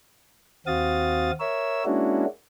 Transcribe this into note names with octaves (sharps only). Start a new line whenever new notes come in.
D#2 C4 F#4 F5 D#6 A6
A#4 C#5 E5 E6
G#3 A#3 C#4 D4 E4 F#4